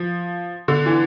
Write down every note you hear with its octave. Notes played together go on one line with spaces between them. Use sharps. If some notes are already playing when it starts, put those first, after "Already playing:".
Already playing: F3
D3
E3